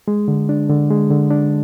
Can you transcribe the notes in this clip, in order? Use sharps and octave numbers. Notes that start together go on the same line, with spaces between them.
G#3
D3
D4
D3
G#3
D3
D4